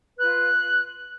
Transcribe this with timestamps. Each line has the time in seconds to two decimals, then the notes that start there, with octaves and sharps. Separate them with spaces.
0.17 F4 B4 F#6